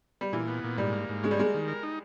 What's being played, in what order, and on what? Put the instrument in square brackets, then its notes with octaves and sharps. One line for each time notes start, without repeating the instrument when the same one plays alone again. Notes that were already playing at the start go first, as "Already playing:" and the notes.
[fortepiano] G3
[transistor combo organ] A#2 [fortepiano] E3
[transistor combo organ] B3
A#2
[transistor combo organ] G#2 [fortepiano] G3
[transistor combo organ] A#3
G#2
[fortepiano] G#3 [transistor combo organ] C#4
[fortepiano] G3
[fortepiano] G#3 [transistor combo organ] A#3
[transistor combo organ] D#3
A#4
D#4